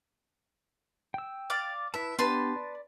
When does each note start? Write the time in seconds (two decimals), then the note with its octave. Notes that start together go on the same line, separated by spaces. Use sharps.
1.14 G5 E6
1.50 D5 F5 D6
1.94 E4 B4 E5 A5
2.19 B3 D4 G4 B4 A5 C6
2.56 D5